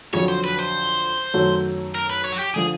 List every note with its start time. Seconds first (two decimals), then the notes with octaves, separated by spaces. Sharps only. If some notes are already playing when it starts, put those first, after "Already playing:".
0.13 F2 D3 F#3 C#5
0.28 C5
0.44 B4
0.59 C5
1.34 F#2 D#3 F#3 A3
1.95 A#4
2.10 B4
2.24 C#5
2.32 F#4
2.39 G4
2.54 D3 F3 G#4